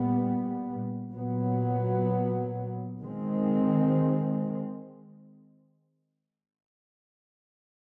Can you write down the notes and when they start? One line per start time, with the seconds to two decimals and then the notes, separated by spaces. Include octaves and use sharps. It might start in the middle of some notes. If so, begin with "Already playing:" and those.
Already playing: A#2 G3 B3
1.12 A#2 F#3 B3
3.02 D#3 G#3 C4